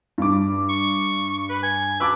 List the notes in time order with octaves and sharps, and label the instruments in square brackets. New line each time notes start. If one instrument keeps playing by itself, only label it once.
[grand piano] G2 D6
[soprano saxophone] C#6
B4
G#5
[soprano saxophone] B4 [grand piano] A5 D6 E6